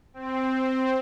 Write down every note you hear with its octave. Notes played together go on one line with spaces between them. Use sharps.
C4